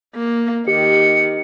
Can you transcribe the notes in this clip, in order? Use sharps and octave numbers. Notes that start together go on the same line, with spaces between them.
A#3
D#3 G4 C#7